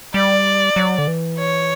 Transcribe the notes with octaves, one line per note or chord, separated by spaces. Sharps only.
G3 D5
F#3
D3
E3
C#5